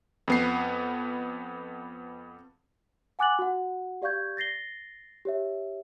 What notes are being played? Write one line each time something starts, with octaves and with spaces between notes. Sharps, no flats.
F2 B3 C7
F#5 G#5 D6 F#6 A6 F#7
F#4 F#5
G4 D5 F5 C#6 G6 G#6
A6 A#6 C7 G7
G4 C#5 E5